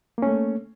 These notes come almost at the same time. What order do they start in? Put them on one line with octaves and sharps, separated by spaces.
A#3 C#4 A3